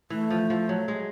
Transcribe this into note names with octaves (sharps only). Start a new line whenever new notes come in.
E3 A3
F3
F3
F#3
G#3